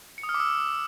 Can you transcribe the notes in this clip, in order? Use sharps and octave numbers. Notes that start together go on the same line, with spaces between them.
C#7
D#6
F6
D6
E6